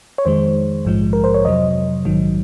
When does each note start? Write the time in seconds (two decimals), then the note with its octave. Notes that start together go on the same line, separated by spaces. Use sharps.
0.18 C#5
0.25 F2 D#3 G#3 C5
0.85 A#1 G#2 F3 G#3
1.13 A#4
1.24 C5
1.34 C#5
1.45 F2 C3 F#3 D#5
2.05 A#1 G#2 D#3 F#3